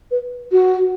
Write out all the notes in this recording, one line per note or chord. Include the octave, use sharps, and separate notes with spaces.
B4
F#4